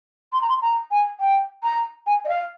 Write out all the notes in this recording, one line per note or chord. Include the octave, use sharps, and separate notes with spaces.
C6
A#5
C6
A#5
G#5
G5
A#5
G#5
D#5
F5